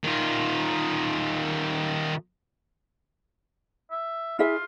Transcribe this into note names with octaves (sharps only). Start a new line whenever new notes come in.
D#3 F4
E5
E4 F4 G#4 E5